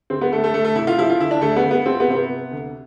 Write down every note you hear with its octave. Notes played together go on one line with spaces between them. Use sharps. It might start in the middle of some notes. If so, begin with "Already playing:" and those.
D2 C4
B3
D2 A3
A3
D2 A3
A3
C3 E4
F4
F3 E4
F4
D2 E4
D4
D2 A3
B3
D2
B3
F3 C4
B3
C3 C4
B3
C3
D2